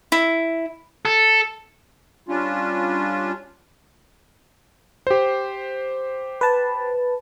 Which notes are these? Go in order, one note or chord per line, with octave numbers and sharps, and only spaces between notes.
E4
A4
G3 C#4 D4 F4
G4 C5
B4 A5